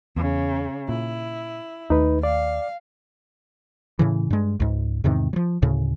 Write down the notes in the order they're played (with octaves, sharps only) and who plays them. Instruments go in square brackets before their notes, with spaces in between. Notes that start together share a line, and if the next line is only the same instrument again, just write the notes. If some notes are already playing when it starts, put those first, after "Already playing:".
[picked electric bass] E2 [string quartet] C#3
[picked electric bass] A#2 [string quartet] E4
[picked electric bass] D#2 A3 [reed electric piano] D#4 B4
[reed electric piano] D5 [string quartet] F5
[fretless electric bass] A2 C#3 E3
G2 G#3
C#2 G#2
E2 G#2 C3 D#3
F3 F#3
D2 A2 C#3